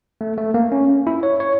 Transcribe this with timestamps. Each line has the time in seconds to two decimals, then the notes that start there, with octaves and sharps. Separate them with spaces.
0.21 A3
0.38 A3
0.54 A#3
0.72 C#4
1.07 E4
1.23 C#5
1.40 C#5